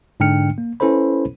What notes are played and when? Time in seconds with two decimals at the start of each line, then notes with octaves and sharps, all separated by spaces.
0.20 G#2 D3 D4 G5 F6 C#7
0.58 A#3
0.80 C#4 E4 A4 B4 C5 B5